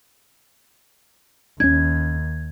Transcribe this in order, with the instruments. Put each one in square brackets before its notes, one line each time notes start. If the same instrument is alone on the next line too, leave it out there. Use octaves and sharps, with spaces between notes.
[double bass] D#2 [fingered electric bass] C#4 D4 [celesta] G#6